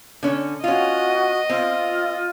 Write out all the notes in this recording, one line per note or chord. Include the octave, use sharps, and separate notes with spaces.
D3 C#4
C#4 F4 F#4 D#5
C4 F4